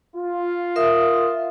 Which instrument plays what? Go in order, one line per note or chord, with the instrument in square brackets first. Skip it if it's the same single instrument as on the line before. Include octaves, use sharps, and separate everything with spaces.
[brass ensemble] F4
[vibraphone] A#4 E5 D#6